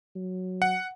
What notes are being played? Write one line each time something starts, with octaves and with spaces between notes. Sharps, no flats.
F#3
F#5